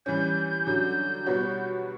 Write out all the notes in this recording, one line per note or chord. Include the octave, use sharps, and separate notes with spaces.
E3 G3 C#4 G6
D3 F#3 C#4
B2 G3 B3 F#4 C#5